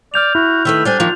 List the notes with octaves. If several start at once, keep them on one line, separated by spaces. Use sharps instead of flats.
D5 F6 G6 F7
E4 F#4
D#3 A3 B4 E5
G3 D4 C5 G#5
D#3 F3 A#3 F4 F7